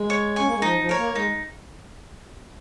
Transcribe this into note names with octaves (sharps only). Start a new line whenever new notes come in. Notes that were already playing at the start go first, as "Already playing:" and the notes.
Already playing: G#3
C#5
C#4 G#5 C#6
A#3
G#3
F3 D#4
F3
A#4 C#5
A#3
G#3 D#4